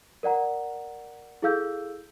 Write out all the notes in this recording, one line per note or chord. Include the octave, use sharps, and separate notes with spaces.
A#4 D5 F#5 A#5
E4 G#4 A4 F5 E6 G6